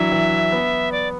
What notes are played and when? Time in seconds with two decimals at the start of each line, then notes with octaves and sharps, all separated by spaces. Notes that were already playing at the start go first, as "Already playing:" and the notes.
Already playing: E3 F#3 D4 E5
0.12 E3
0.52 B3
0.92 D5